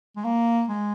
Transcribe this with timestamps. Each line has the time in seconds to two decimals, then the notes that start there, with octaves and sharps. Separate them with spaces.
0.17 G#3
0.25 A#3
0.69 G#3